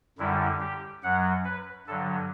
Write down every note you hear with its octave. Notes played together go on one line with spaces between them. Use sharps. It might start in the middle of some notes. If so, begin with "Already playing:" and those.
F#2 D3 G3 E4
G4
F#2 F#3 F#5
B4
G2 D3 F#3 A4